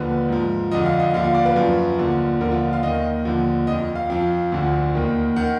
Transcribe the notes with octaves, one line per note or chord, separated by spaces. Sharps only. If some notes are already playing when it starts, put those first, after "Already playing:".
Already playing: D#2 D3 F3 B4
G#2 F3
F2 D3 F3 D#5
F5
D#5
D#2 D3 F3 F5
F5
D5
B4
F#2 F3
D#2 D3 F3
D#2 D3 F3 A#4
F4
F5
D#2 D#3 D#5
D#2 D3 F3
F2 F3 D#5
F5
F2 F3 F5
D2 D3 F3
D#2 D#3
D#3 F#5